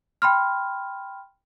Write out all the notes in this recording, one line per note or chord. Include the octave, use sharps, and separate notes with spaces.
G5 B5 C6 F6